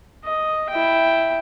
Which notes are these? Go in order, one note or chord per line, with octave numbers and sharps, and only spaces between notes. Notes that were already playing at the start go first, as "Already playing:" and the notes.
D#5
E4 G5